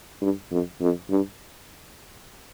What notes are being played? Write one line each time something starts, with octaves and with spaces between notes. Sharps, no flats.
G2
F2
F2
G2